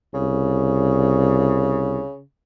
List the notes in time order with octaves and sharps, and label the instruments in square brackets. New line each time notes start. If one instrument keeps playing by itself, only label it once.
[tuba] C2 [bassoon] C#3